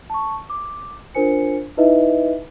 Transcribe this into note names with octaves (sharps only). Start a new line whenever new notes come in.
A5 C#6
D6
D4 F4 A#4 C5 G#5 C#7
D#4 E4 B4 D#5 E5